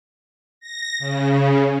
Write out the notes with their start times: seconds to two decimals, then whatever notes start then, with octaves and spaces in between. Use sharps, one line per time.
0.60 A#6
0.99 C#3